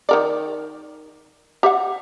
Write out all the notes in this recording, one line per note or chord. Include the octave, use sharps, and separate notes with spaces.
D#3 A#4 D5
G4 E5 F#5